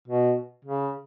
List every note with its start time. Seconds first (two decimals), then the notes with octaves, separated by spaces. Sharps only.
0.08 B2
0.64 C#3